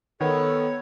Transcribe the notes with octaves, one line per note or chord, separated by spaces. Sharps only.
D#3 B3 A4 C#5